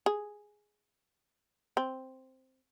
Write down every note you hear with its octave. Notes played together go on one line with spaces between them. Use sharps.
G#4
C4